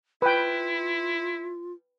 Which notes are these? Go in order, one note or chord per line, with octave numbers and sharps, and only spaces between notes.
E4 F4 B4 G5